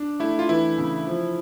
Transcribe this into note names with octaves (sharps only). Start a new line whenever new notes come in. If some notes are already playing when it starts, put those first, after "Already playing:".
Already playing: D4
A3 E4
F4
E3 E4
C#3
F3